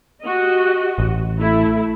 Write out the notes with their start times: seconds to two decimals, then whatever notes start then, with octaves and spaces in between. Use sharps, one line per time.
0.22 F#4 G4 D#5
0.98 A1
1.39 A3 E4